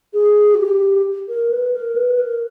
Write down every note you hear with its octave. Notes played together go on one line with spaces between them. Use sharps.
G#4
F#4
G4
A#4
B4
A#4
B4
A#4